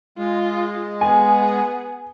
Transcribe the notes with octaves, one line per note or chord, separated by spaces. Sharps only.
G#3 F4
B3 G#4 G#5